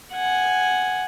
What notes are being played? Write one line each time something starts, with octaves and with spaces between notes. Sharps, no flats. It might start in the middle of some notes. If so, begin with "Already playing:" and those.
F#5 G#5